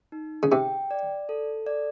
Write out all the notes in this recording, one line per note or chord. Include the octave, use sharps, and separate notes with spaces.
D#4
C#3
C3 G5
D5
A4
D5